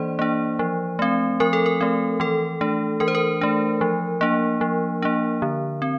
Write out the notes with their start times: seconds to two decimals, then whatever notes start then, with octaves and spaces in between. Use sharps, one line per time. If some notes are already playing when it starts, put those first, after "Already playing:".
Already playing: E3 A#3 D4 C5 D5
0.19 A#3 D4
0.59 F3
0.99 A3 C4
1.40 F3 A#4
1.53 A4
1.66 A#4
1.81 A3 C4
2.20 E3 A4
2.61 A3 D4
3.00 E3 A#4
3.08 C5
3.15 A#4
3.41 A3 D4
3.81 F3
4.21 A#3 D4
4.61 F3
5.02 A#3 D4
5.42 D3
5.82 C4